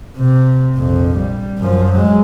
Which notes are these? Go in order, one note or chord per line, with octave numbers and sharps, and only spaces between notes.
C3
A#1 F2
G3
F#2 F3
F#3 G#3